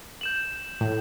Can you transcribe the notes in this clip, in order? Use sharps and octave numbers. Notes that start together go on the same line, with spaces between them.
G6 E7 F#7
A2